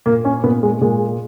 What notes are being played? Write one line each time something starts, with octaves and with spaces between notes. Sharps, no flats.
A#2 A#3
C#4
A#2 B3
G#3
A#2 G#3